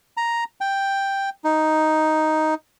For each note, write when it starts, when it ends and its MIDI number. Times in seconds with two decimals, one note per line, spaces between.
0.17 0.44 82
0.61 1.29 79
1.44 2.54 63